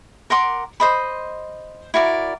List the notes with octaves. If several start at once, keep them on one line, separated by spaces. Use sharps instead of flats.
A#4 F#5 C6 D6
C5 D#5 B5
E4 F#4 A#4 D5